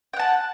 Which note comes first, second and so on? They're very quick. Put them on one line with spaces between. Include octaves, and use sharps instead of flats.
G5 F#5 A5